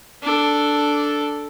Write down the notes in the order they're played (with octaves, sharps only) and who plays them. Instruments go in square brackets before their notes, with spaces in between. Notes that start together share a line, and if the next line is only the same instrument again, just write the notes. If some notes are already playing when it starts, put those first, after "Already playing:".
[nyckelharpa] D4 A4